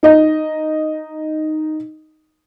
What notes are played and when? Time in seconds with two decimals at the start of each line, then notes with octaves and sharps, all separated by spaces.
0.03 D#4 D#5